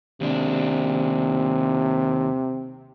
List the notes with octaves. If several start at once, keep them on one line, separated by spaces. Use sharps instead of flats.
D#2 C3 D4